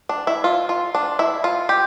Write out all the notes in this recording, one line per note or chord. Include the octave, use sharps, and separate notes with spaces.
D4
E4
F4
F4
D4
E4
F4
G4